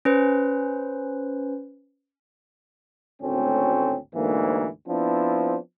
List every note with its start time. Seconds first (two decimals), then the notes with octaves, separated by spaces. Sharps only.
0.05 C#4 B4 C5
3.22 G#1 D2 A2 C4 C#4
4.15 D2 G#2 E3 A#3
4.88 F3 B3 C4 D4 E4